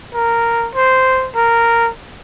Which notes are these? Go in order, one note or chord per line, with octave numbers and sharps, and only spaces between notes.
A#4
C5
A#4